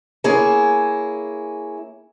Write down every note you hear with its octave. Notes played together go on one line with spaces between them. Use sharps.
A#3 C#4 E4 G#4